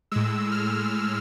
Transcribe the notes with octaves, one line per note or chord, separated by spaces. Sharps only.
A2 G#3 E6
F6